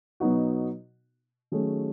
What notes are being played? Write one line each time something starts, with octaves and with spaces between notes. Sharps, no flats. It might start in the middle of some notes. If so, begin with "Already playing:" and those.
B2 F#3 B3 D#4 F#4
D#3 F#3 A3 C#4 G#4